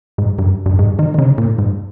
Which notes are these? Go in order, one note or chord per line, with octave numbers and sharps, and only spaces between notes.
G#2
G2
G2
G#2
D#3
D#3
C#3
A#2
G#2